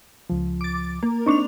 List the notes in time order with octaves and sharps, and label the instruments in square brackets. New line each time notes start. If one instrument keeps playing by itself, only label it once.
[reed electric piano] C#2 F3
[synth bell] D6 A6
A#3
[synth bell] C4 D4 F7 [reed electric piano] D#4 C#6